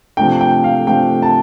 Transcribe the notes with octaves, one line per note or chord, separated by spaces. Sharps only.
C3 F3 A3 D4 G5
G5
F5
C3 F3 A3 D4 G5
A5